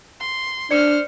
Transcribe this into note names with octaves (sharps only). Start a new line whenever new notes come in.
C6
D4 C5 D5 F6 C#7